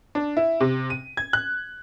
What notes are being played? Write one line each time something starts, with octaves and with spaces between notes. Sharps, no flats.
D4
E4
C3
D#7
G#6
F#6